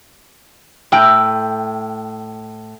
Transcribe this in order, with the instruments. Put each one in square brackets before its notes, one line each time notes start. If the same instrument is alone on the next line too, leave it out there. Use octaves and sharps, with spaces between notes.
[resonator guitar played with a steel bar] A2 G5